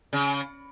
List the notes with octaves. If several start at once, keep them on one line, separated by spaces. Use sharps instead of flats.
C#3